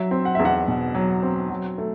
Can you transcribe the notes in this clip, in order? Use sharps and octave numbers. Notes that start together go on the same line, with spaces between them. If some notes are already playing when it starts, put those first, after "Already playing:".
Already playing: F#3 E5
C4
F#5
E2 E5
F#5
B2
F#3
C4
F#3
A3